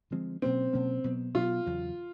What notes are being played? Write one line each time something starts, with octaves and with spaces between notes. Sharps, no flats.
D3 F3 G#3 C4
B2 F#3 A#3 C4 C#4
B2 F#3 A#3 C#4
B2 F#3 B3
B2 F#3 B3 F4
E2 C#3 F#3